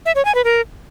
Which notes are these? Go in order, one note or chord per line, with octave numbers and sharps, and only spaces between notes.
E5
C#5
G#5
B4
A#4